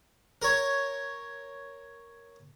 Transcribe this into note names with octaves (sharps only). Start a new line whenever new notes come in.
A#4 C#5